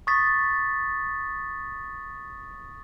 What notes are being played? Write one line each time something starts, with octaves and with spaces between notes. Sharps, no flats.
C#6 D#6 A6 B6